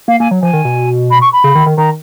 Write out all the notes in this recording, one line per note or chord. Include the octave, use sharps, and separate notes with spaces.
A#3 F5
A#3 G#5
F#3
F3 G#5
D#3
B2
B5
C#6
B5
C#3
D#3
D#3
D#3 A#5